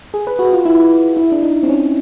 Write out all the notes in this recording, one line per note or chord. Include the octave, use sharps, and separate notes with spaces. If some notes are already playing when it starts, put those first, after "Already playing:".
G#4
B4
F#4
F4
E4
E4
D4
D#4
C4
C#4